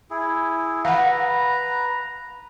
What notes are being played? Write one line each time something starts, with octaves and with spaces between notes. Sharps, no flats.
E4 G#4
B4 F5 F#5 A#5